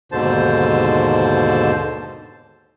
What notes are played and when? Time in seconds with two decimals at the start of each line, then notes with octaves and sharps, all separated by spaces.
0.12 D#2 G#2 B2 D3 C5 A5